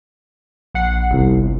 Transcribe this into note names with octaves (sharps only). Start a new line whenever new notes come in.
A#1 F#5 C7
G1 C2